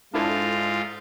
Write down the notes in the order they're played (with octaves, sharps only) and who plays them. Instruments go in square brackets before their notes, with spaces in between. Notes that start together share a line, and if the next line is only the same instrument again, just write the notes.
[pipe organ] G#2 F4 [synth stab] D4 E4 A4